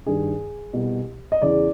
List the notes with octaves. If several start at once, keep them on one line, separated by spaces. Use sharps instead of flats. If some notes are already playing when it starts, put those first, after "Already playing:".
G2 D#3 G#4
C2 B2
D#5
E2 C#3 E3 D5